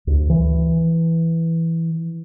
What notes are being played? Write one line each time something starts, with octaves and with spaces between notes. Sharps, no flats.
D2
E3